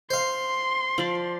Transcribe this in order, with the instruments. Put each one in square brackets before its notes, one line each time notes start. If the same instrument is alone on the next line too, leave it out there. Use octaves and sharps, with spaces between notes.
[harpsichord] C5 F5 [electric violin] C6
[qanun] F3 D5